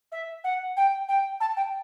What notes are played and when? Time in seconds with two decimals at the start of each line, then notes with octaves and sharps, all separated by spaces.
0.11 E5
0.44 F#5
0.76 G5
1.08 G5
1.40 A5
1.56 G5